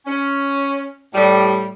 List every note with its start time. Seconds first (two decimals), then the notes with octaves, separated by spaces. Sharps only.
0.06 C#4
1.13 A2 G3